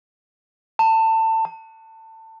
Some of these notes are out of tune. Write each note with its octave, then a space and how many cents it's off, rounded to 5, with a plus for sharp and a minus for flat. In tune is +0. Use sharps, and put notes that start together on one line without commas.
A5 +25
A5 +25